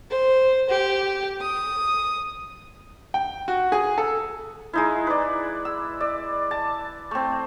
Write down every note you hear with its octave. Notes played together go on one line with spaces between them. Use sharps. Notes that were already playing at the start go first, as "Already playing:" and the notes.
C5
G4
D#6
G5
F#4
G#4
A4
G#3 D#4 E4
B4 D5
E6
D5
A5
A3 C4